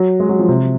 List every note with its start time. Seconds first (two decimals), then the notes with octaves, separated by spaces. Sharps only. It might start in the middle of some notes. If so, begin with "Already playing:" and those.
Already playing: F#3
0.20 G#3
0.29 F#3
0.39 F3
0.48 C3